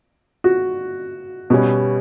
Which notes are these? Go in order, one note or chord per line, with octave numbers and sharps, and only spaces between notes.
F#4
B2 G3 C#4